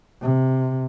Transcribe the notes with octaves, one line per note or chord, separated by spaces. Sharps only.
C3